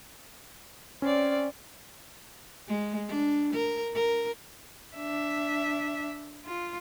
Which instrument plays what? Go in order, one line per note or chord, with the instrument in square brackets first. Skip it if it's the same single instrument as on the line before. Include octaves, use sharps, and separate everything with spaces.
[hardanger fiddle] C4 D5 [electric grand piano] C#4
[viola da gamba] G#3
D4
A#4
A#4
[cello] D4 E5
F4